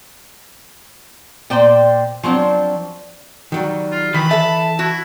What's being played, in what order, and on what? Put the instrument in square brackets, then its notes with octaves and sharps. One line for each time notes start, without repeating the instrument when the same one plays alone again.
[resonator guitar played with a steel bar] A#2 C5 D5 G5
F3 F#3 C4 D4
[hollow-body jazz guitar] D#3 F#3 G3
[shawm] F4
[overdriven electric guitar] D#3 [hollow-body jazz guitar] E3 [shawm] B5
[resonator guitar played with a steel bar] A4 E5 [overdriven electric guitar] A5
[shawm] E4 [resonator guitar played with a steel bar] F#4